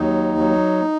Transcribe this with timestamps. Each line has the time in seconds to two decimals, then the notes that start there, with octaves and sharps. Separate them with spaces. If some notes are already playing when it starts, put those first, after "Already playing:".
Already playing: D#2 F#3 D#4
0.38 F#3